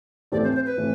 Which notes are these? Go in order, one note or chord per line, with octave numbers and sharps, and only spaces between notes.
A2 E3 A3 C4 G4 D5
C5
C5
B4
A2 E3 A3 C4